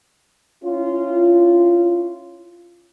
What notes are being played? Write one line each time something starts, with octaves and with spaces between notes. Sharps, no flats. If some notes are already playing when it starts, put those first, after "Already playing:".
C#4 E4 F4